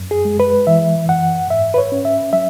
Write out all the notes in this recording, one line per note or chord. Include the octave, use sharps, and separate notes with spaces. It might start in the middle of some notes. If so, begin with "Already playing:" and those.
Already playing: F#2
G#4
G#3
B4
E3 E5
F#2 F#5
G#2 E5
B4
C#5
C#4
E5
F#3 E5